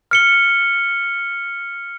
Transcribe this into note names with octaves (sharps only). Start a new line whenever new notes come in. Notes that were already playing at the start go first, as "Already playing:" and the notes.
F6 C#7 G7